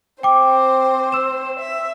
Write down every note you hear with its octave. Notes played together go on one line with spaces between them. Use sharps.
C4 C5 G5 D6
E6 E7
E5